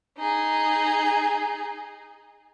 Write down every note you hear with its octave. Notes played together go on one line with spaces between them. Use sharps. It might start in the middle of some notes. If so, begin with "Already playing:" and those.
D#4 G#4